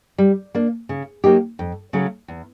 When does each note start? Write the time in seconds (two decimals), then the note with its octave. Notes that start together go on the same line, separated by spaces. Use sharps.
0.18 G3
0.55 A#3 D4
0.89 C#3
1.24 F#3 A#3 D#4 G4
1.59 F2
1.93 C#3 F#3 A3
2.28 E2